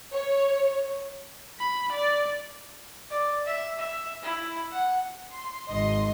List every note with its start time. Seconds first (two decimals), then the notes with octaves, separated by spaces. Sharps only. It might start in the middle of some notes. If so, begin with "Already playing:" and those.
0.13 C#5
1.59 B5
1.92 D5
3.10 D5
3.46 E5
3.79 E5
4.23 E4
4.72 F#5
5.33 C6
5.69 G#1 D#5 C6